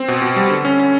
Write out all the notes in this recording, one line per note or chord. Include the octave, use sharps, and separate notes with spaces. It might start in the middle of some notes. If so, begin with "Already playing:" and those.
Already playing: C4
B2
B2
G3
D3
C#4
C#4